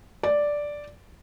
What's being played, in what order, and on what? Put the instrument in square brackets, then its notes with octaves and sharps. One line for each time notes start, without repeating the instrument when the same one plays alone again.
[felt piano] D5